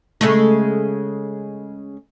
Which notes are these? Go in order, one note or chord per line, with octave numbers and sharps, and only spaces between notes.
C#3 G#3 A3